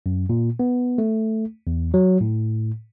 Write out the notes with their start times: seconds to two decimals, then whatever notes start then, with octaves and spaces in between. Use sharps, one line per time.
0.06 F#2
0.30 A#2
0.59 B3
0.98 A3
1.67 E2
1.94 F#3
2.21 A2